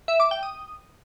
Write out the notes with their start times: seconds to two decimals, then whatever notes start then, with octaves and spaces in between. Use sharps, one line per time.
0.08 E5
0.20 D6
0.31 G5
0.43 D#6